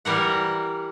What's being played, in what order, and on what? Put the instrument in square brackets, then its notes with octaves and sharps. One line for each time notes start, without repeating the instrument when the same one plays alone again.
[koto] E3 G3 A#4 F#5